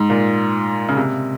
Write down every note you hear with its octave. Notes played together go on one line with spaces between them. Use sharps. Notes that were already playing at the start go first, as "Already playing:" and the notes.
Already playing: G#2
A#2
C#3
C3